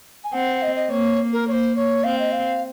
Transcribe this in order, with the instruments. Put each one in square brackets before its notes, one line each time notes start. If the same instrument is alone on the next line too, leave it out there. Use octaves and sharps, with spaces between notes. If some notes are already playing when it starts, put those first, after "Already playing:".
[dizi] G#5
[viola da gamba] C4 [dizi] F#5
[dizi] D#5
D#5
[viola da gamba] A#3 [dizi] C#5
[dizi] A#4
[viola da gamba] A#3 [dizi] C#5
[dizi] C5
C#5
[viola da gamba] C4 [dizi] F5
[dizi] D#5
F5